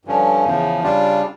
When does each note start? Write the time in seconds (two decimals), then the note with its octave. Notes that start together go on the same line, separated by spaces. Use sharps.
0.05 G2 D3 F3 C#4
0.44 E2 C#3 F3
0.82 C#3 G3 D4 F4